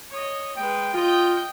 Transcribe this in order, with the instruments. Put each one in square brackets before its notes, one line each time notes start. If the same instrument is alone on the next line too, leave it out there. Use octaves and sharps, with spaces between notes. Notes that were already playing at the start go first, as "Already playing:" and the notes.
[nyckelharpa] C#5 D#5
[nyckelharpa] G#3 B4 [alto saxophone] G5
[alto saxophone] F4 [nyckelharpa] D#5 G5